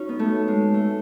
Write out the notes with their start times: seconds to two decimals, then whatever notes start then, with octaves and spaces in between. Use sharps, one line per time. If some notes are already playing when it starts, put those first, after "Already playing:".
Already playing: C#4 D#4 F#4
0.09 B3
0.19 A3
0.48 G#3
0.74 A3